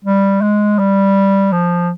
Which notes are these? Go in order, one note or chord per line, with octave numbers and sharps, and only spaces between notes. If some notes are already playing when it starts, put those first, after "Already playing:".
G3
G#3
G3
F3